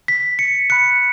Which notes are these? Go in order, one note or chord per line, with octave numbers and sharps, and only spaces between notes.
B6
C#7
B5 F#6 C#7